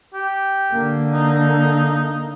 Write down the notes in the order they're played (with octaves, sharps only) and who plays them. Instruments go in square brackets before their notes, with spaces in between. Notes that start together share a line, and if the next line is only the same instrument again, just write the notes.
[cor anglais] G4
[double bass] D3 A#3
[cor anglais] D#4